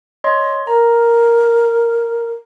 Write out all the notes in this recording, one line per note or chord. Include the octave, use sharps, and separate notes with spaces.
C#5 D#5 C6
A#4 A#5